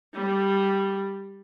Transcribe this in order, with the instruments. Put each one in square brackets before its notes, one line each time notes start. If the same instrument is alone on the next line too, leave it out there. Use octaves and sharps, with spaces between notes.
[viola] G3